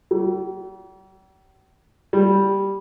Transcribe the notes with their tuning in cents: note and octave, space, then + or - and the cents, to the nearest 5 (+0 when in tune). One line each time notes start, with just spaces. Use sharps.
G3 -45
G3 +0